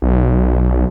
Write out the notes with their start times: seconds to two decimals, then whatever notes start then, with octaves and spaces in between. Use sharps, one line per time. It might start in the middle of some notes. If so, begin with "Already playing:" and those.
0.02 B1